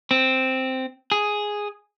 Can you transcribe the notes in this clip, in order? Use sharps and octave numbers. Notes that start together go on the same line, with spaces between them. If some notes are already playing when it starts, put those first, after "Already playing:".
C4
G#4